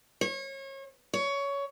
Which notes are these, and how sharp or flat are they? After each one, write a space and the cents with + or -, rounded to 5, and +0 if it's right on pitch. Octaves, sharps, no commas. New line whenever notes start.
C#5 -35
C#5 +15